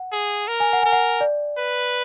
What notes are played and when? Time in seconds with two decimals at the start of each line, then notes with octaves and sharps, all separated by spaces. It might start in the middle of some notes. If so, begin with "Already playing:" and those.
Already playing: F#5
0.12 G#4
0.48 A#4
0.60 G#5
0.73 F#5
0.83 A#4 G#5
0.93 F#5
1.21 D5
1.58 B4